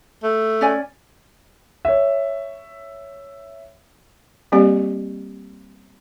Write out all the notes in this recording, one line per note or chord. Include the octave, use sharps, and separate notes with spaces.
A3
C#4 D5 G#5
C#5 E5
G3 A#3 C4 G4 D5